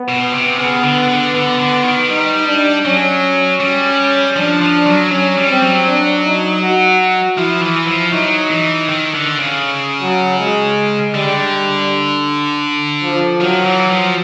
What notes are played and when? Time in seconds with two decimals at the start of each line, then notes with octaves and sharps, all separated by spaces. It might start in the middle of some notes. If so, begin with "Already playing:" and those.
Already playing: B3
0.09 B2
0.33 C3
0.59 C#3 B3
0.84 D3
1.09 D3
1.34 D3 B3
1.60 D3
1.84 D#3
2.09 G3 D#4
2.47 D4
2.85 F#3 C#4
3.60 G3 C#4
4.36 F3 D4
4.61 F3
4.87 F#3
5.11 F#3 C#4
5.37 G3
5.50 C4
5.62 F#3
5.87 D4
6.25 D#4
6.62 F#4
7.38 F3 E4
7.62 E3
7.88 F3
8.13 F#3 D#4
8.50 E3
8.89 D#3
9.14 D3
9.39 C#3
10.02 F#3
10.39 G#3
11.15 D3 G3
13.04 F3
13.41 D#3 F#3
13.65 E3
13.91 F3